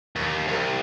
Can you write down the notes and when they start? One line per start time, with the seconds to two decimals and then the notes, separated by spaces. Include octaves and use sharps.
0.16 D#2
0.48 C2